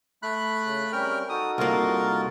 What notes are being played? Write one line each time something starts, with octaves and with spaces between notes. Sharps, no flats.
A3 B5 F#6
C#3
G3 C4 C#4 A#4 G5 F6
D#4 F#4 A4 D#6
C2 A#3 F4 A#4